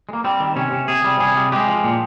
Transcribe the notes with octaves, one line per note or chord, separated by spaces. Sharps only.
G#3
A#3
G3 C4
D#3
C3 C#4
C3
C3 G#4
G3
C3 G#4
G3
G#3 G4
F3
A#2